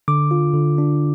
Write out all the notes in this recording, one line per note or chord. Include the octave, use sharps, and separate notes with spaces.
D3 D6
F4
D3
D4